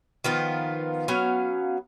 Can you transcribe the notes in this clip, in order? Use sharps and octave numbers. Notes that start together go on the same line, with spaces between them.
D#3 F3 B3 F4
F#3 B3 C#4 F5